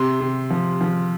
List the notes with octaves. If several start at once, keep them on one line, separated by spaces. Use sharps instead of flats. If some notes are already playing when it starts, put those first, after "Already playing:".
Already playing: C3 C6
C3
F3
F3